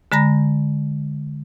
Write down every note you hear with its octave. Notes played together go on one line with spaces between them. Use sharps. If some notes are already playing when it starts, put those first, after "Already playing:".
D3 G#3 A#5 B5 A#6